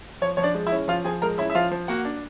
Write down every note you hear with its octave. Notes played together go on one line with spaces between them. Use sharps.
F3 C#5
F3 C#5
D4 D5
G#3
E4 E5
C#4
F3 F4 F5
F3 G#4 G#5
G#3 A#4 A#5
C#4 E4 E5
E5
F3 F4 F5
F3
A#3 F#4 F#5
D4